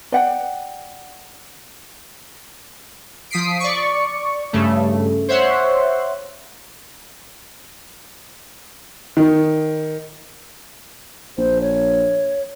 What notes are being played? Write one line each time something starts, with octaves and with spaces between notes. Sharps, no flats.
D5 F#5 G5
F3 D#6 B6 C7 D7
D5 C#6
G2 C#3 A3
C5 C#5 E5 F#5 C6
D#3
A#1 C5
C#5